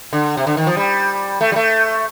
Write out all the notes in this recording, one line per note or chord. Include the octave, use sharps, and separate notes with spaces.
D3
C3
D3
D#3
F3
G3
A3
G3
A3